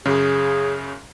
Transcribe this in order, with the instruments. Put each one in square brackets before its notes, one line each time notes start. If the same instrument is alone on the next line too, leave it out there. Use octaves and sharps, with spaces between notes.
[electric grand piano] F#2 C#3 [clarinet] G#4